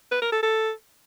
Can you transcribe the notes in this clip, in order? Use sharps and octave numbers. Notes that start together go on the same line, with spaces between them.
B4
A#4
A4
A4